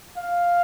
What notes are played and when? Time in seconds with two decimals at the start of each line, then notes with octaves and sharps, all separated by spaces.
0.18 F5